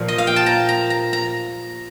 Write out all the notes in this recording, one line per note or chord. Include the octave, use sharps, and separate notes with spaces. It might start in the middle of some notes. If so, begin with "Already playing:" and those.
Already playing: A#2 F3 A#3
D#5
F5
G5
A5
A#5
A#5
A#5
A#5